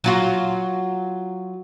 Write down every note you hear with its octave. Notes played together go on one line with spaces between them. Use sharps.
F#3 F4 F#4